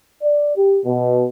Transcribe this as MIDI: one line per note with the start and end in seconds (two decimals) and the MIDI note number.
0.22 0.53 74
0.56 0.79 67
0.85 1.26 47